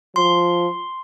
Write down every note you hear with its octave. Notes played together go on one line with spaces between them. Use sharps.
F3 C6